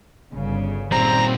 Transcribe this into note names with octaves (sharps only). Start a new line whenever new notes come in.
G1 C#3
A#2 G3 C4 A#5